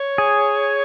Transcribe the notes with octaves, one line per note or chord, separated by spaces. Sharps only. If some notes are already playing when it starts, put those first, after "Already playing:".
Already playing: C#5
G#4